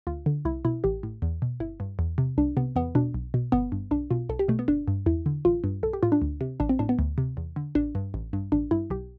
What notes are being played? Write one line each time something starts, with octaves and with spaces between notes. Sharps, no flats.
D2 F4
D3
C2 E4
B2 E4
A1 G4
A2
E2
B2
G1 E4
G2
E2
C3
C2 D4
C3 B3
E2 B3
B2 D4
B1
B2
G1 B3
G2
B1 D4
B2 F4
B1 A4
G4
B2 A3
B3
G1 D4
G2
E2 E4
D3
A1 F4
G2
B1 A4
G4
A2 F4
D4
D2
C3
A1 D4
C4
A2 D4
B3
D2
C3
E2
D3
A1 D4
G2
A1
G2
A1 D4
G2 E4
B1 G4